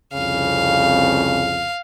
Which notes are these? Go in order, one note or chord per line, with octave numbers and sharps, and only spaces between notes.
C2 F2 C#3 F5